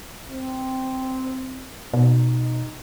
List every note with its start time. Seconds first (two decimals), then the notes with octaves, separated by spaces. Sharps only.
0.31 C4
1.93 B2 D#4